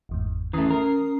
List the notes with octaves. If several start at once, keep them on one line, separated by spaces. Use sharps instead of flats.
G1 E2 G#2
E3 A3 C#4 A#5 D#6 C7
A#4